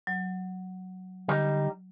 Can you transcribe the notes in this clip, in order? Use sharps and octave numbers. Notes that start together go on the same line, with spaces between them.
F#3
D3 G3 D#4